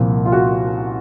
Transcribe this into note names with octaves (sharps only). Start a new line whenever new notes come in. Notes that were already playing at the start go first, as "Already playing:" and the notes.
Already playing: C2 A#2 F3
F4
F#4